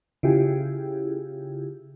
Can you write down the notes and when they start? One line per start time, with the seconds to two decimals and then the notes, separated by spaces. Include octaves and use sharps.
0.23 C#3 E4 F4 G4 G#4